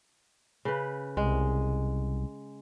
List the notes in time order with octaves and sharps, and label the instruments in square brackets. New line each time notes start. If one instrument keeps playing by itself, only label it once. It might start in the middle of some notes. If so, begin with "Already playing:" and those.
[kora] C#3 B4
[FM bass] C2 [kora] G#3